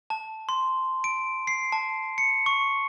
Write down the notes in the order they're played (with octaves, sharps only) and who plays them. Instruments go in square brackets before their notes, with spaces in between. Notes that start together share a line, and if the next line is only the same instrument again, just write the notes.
[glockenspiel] A5
C6
D7
C7
A5
C#7
C#6